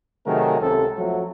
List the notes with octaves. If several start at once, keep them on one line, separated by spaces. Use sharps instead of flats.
C3 D#3 F#3 A3 G#4 A#4
C#2 C3 A4
F2 F#3 A3